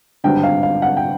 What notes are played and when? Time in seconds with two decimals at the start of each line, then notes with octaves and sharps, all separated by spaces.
0.24 G#1 G2 D3 G5
0.43 F5
0.63 F5
0.82 F#5
0.97 G5